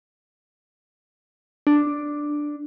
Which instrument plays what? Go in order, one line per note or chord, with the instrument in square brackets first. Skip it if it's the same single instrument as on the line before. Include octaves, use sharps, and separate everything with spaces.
[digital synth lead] D4